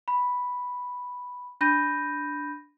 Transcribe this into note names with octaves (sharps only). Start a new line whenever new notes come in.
B5
D4 B5 G6 A#6 D#7